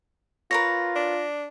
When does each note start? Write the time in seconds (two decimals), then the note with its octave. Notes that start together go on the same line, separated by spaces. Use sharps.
0.51 F4 A#4 B4 C#5 A#6
0.96 D4